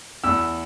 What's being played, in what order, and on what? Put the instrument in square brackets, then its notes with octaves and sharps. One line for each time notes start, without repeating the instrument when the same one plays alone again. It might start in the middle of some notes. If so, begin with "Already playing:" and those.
[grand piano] E2 E6